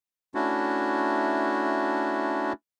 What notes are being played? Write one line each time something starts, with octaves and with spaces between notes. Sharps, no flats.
A3 C#4 D4 E4 F#4